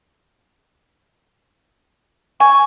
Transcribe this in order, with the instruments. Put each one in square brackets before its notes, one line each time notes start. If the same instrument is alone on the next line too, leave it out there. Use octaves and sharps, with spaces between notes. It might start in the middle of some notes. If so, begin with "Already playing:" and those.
[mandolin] G#5 [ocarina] C#6